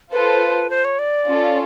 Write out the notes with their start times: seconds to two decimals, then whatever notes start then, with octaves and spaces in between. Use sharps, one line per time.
0.12 F4 A4 B4 C5
0.70 C5
0.85 C#5
0.99 D5
1.27 C#4 F4 A4